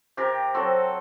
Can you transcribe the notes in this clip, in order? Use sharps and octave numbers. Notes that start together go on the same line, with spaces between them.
C3 G4 A#4
F#3 C4 F#4 A4